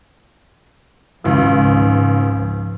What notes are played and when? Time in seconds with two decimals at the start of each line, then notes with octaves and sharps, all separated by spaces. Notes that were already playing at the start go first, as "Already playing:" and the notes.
1.24 G#1 C#2 G#2 F3